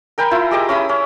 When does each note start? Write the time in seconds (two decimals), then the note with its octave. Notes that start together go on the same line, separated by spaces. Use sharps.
0.18 A#4 G5 G#5 B5
0.31 E4 F4 E5
0.51 G4 G#4 D#5 D6
0.69 C#4 E4 B5 D#6
0.89 C#4